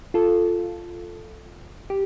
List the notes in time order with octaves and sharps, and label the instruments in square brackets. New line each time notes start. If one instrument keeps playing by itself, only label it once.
[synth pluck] F4 A4
G4